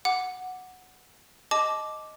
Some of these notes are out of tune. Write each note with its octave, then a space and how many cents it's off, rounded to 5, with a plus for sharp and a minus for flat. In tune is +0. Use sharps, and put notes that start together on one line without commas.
F#5 -5 D6 -5
D#5 +0 A5 -25 D6 +0